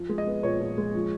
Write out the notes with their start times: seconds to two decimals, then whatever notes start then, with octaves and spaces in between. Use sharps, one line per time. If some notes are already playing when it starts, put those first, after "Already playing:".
Already playing: F3
0.09 G#3
0.18 D#5
0.27 B3
0.43 A#2 C#5
0.61 F3
0.78 G#3
0.95 F3